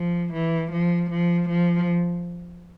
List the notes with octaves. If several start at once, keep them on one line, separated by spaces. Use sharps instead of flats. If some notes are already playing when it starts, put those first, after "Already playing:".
Already playing: F3
E3
F3
F3
F3